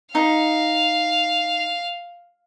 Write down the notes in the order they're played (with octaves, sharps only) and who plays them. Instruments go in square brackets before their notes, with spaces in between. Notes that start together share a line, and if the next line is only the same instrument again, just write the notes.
[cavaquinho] D#4 [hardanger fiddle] F5